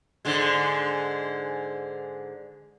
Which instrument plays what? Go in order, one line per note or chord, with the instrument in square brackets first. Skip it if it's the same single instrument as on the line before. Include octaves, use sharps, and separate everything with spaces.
[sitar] G#2 D3 G#3